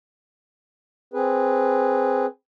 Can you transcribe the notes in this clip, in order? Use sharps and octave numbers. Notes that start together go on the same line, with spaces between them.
C4 G#4 B4